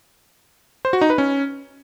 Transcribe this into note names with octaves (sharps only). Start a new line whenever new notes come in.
C5
F#4
D#4
B4
C#4